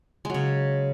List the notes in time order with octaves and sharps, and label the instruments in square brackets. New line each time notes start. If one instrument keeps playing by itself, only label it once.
[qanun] G#3
F#3
C#3